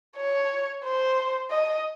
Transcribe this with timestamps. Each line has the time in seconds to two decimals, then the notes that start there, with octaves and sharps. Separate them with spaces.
0.17 C#5
0.84 C5
1.51 D#5